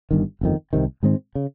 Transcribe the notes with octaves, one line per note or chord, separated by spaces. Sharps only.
G1 G2 D#3
G1 F2 D#3
C2 C3 D#3
G#2 D#3 G#3 C4
C#3